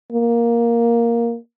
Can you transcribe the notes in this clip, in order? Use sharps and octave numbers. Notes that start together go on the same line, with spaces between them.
A#3